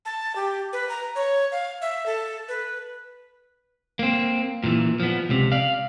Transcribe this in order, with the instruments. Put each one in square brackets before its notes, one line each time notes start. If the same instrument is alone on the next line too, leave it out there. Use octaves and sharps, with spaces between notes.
[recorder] A5
G4
B4
A#5
C#5
F5
E5
A4
B4
[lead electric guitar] A#3 C4
A#2 E3
F3 B3
C#2 C3
D5 F5